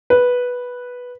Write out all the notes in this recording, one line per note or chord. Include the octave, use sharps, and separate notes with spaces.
B4